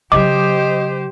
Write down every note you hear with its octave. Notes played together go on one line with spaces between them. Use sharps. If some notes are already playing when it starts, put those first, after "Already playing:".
C#3 F#3 G4 C5 D#5 D6